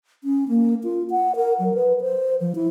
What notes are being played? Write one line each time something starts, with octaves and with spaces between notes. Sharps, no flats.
C#4
A#3
F4
F#5
A#4
F#3
B4
C5
F3
E4